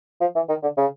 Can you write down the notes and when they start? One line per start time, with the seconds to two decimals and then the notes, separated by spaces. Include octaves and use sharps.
0.21 F3
0.35 E3
0.49 D#3
0.63 D3
0.77 C#3